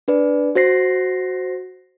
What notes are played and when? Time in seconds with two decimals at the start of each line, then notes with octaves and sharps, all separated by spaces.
0.08 D4 B4 D5
0.55 F#4 C5 A#6 C7